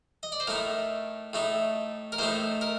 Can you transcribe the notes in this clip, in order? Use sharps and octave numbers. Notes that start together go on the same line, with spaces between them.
D#5
D5
C5
A2 A3 D#4 A#4
A2 A3 D#4
A#4
A2 A3 D#4 C5
A#4